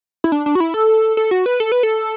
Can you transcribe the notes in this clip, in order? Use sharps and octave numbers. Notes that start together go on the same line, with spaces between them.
E4
D4
D4
F#4
E4
A4
A4
F#4
B4
A4
B4
A4